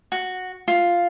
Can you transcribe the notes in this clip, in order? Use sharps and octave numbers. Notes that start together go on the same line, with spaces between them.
F#4
F4